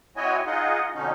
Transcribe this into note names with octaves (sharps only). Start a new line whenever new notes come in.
C4 E4 F#4 C#5 D#5 G#5
D#4 F4 G#4 D#5 F#5
F2 B2 D3 C#4 D#4